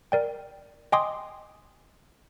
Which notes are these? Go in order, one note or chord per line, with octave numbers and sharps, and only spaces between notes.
A#4 D5 G5
D#5 G5 G#5 C6 D6 D#6